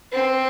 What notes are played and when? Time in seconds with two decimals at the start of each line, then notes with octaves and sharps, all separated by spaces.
0.13 C4